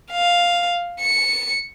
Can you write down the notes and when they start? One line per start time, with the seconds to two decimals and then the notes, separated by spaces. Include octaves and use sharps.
0.12 F5
1.00 C#7